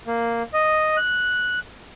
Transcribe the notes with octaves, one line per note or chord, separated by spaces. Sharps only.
A#3
D#5
F#6